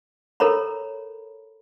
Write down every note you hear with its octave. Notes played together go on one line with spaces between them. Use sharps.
A4 A#4 C#5 A#5 B5